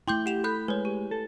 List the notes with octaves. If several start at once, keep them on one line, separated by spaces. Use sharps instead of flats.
A3 E4 G5 C6 D6 G6
G4 F#5 E7 F7
A4 B5 F#6 G6
G#3 B4 C#5
G4
A4